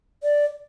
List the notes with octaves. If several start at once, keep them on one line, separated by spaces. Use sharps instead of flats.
D5